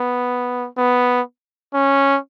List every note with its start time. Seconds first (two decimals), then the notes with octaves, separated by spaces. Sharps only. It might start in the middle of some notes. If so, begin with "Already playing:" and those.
Already playing: B3
0.78 B3
1.74 C#4